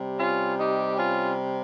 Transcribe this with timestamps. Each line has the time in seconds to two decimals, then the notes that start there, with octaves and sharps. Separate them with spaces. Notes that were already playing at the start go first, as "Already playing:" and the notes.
Already playing: C3 G3
0.17 C#4 F4
0.57 D#4 G4
0.96 C#4 F4